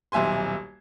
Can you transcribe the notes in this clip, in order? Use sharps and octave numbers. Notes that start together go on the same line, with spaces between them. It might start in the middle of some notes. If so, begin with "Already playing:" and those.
D#1 B1 E5 G#5 C6